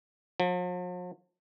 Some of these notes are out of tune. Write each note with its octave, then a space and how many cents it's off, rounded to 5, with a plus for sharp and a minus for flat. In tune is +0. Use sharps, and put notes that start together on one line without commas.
F3 +45